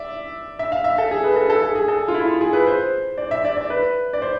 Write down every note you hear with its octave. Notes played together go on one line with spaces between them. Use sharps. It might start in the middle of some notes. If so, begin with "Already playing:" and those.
Already playing: D5 E5
E5
F5
E5
A4
G#4
B4
A4
A4
G#4
G#4
A4
F4
E4
F4
G#4
B4
C5
D5
E5
D5
D5
B4
D5
C5